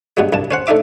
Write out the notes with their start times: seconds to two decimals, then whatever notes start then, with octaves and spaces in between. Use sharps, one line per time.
0.17 G2 B2 F#3 G#3
0.32 C2 G2 A5
0.51 C#4 C5 F#5
0.67 A3 D4 D#4 E5 D6